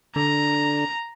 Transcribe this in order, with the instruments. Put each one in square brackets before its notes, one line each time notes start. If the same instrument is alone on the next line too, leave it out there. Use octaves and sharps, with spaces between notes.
[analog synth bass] D3 [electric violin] A#5